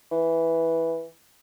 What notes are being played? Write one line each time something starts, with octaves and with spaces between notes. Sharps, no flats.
E3